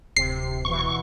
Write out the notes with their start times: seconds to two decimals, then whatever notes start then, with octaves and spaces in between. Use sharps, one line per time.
0.16 D1 C3 C7
0.65 B2 E3 C#6